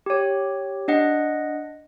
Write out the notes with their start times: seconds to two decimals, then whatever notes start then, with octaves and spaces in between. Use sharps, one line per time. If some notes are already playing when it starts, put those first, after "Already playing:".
0.06 G4 C#5
0.88 D4 D#5 F#5